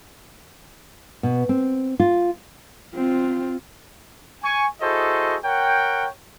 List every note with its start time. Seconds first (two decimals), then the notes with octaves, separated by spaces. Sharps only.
1.23 B2
1.49 C4
2.00 F4
2.95 C4 F4
4.44 G#5 C#6
4.81 E4 F#4 G#4 A4 C5 D#5
5.44 A#4 C#5 F#5 G5